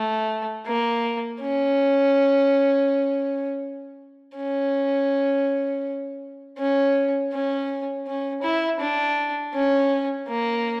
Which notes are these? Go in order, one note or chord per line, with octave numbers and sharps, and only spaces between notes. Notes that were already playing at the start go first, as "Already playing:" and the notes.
Already playing: A3
A#3
C#4
C#4
C#4
C#4
C#4
E4
D4
C#4
A#3